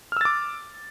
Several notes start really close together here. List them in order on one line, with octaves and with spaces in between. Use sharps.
F6 E6 A6 D6